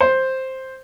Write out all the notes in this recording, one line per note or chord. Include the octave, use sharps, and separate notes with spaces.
C5